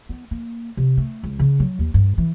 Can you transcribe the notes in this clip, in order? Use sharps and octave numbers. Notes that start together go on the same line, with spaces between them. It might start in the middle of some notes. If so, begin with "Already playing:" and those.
B3
A#3
C3
A3
C#2
C#3
F#3
D#2
G2
E3